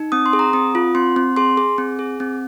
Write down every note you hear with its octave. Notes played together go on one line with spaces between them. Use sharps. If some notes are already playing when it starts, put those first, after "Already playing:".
Already playing: D#4
C4 D#6
C6
G#4
A#5
C4 D#6
F4
C4 C6
C4
G#4 C6
G#4
C4
G#4
C4